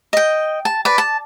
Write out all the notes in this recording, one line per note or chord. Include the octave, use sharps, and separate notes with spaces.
D#5 G5
A5
B4 D5
A5